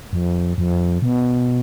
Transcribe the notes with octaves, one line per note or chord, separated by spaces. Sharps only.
F2
F2
B2